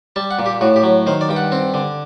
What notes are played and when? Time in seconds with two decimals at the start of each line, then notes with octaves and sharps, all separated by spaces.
0.16 G3 A5
0.31 F#5
0.39 A#2
0.46 G4
0.61 A2 F#4
0.76 G4
0.83 F#3
1.07 D#3 C5
1.21 D5
1.29 G2 G5
1.36 F#5
1.52 C4
1.74 D3